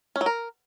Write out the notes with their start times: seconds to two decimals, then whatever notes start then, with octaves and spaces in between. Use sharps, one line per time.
0.16 C#4
0.21 F#3
0.26 A#4